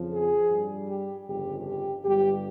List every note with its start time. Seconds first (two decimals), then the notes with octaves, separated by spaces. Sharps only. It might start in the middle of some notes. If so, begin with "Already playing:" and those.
Already playing: F2 C#3 F3
0.11 G#4
0.49 G2 G3
0.89 G4
1.26 G1 F2 C#3 G4
1.65 G4
2.04 G1 G2 G3 G4